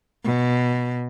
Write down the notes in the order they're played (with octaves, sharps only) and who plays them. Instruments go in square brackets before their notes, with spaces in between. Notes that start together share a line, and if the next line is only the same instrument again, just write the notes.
[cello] B2